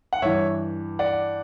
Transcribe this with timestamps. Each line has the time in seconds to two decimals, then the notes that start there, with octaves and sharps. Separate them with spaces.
0.13 F#5
0.22 G2 E3 C#5 E5
0.99 D5 F#5